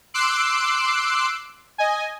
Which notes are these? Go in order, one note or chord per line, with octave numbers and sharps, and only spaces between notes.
C6 D6 E6 F#6 C7 D7
D#5 G#5